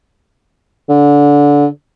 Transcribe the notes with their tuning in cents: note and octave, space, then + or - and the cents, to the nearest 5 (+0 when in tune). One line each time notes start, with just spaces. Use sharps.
D3 -20